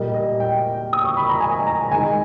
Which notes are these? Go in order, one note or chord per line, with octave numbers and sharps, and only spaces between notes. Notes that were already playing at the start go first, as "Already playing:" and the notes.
Already playing: A#2 G3 A#3 D#5
D#5
G5
D#6
C#6
B5
A#5
G#5
G#5
A#5
D#3 G#3 G#5